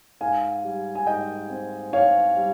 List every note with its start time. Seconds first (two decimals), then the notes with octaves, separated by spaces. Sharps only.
0.21 G#2 F5 G#5
0.64 G3
0.95 G#5
1.06 G#2 D#5 G5
1.50 C4
1.93 G#2 C#5 F5
2.36 G3